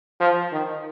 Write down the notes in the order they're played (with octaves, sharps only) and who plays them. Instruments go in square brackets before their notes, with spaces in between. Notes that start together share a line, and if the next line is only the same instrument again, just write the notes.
[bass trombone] F3
D#3